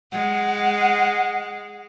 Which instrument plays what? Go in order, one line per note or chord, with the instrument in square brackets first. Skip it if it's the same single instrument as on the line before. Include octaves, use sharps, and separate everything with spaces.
[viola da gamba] G#3 [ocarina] F#5